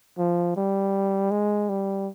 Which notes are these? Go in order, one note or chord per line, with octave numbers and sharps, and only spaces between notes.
F3
G3
G#3
G3